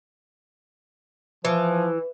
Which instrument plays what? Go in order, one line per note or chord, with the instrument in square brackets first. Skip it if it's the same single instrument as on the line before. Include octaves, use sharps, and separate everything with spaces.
[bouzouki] E3 [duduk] F3 [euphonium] B4